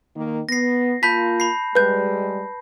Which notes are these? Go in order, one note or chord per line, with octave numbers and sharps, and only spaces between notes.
D#3 A#3
B3 A#6 C7
A#3 F4 A5 B5 G6 B6
B5 C7
G3 G#3 B4 G6